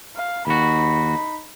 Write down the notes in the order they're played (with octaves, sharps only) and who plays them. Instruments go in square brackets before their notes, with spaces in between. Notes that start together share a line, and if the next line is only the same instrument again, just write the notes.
[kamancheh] F5
[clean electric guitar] D#2 F#4 [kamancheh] D#4 B5